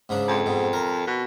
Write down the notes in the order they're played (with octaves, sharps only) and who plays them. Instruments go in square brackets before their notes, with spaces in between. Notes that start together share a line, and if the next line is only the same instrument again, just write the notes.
[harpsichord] G#2 C#3 D4
[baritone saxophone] F2
[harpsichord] G#2 B2
A#4
[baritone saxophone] B2